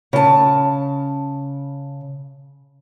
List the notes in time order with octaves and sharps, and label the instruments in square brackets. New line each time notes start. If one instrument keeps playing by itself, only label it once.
[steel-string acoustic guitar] C#3 A5